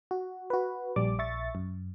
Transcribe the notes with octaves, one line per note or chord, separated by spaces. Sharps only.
F#4
F#4 B4
A#1 G3 D5 D6
A#1 E5 C#6 A6
F#2